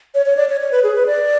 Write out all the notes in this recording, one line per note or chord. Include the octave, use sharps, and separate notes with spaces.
C#5
C#5
D5
C#5
C#5
B4
G#4
B4
D5